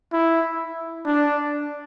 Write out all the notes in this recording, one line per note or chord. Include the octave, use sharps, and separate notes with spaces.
E4
D4